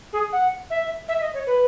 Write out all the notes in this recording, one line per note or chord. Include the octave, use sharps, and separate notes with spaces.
G#4
F#5
E5
E5
D#5
C#5
B4